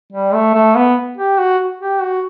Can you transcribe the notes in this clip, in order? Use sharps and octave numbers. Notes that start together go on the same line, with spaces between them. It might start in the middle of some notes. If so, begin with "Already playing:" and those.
G3
A3
A3
B3
G4
F#4
G4
F#4